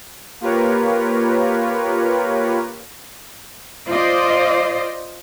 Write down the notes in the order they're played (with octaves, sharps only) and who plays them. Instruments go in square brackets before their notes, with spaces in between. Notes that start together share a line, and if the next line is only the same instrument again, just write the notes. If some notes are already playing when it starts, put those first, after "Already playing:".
[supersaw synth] A#3 F4 G4 A#4 B4 C#5
[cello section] F4 C5 D5 D#5